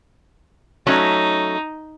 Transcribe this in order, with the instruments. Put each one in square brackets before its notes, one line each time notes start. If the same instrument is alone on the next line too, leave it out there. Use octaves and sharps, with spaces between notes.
[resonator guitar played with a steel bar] F#3 A3 C#4 [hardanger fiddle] D#4